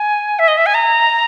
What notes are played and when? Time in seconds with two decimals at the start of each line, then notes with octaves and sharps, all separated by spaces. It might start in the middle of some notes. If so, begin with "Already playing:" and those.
Already playing: G#5
0.39 E5
0.48 D#5
0.57 E5
0.66 G#5
0.74 A#5